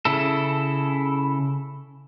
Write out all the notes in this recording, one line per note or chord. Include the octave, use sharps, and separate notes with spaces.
C#3 E4 A4